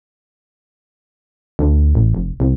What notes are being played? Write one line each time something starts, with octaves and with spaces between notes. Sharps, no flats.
D2
A1
F1
C2